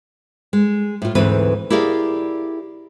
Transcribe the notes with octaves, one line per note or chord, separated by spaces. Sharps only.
G#3
A2 F4
D2 G#2 E3 C4 B4
E4 G4 G#4 A#4 D5 F5